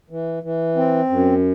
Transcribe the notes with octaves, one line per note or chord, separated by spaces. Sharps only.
E3
E3
C4
F#2